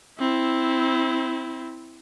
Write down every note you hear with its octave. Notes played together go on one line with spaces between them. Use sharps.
C4 E4